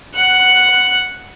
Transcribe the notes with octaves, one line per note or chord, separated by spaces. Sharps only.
F#5 F#6